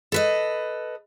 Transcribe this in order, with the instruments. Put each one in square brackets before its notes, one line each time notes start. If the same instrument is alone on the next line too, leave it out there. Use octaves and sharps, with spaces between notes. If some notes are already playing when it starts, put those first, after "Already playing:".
[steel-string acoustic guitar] A4 B4 D#5